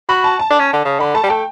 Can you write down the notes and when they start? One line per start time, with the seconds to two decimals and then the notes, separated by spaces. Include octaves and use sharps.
0.09 F#4 B5
0.24 A5
0.39 A5
0.50 D4
0.59 C#4
0.73 D3
0.85 C#3
1.00 D3 B5
1.15 A3 A5
1.23 G3
1.30 A3 G5